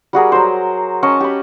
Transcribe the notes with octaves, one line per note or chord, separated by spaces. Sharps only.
G3 F#4 G#4 A#4
F#3 C5
C#4 C#5 D#5 A5
G4 B5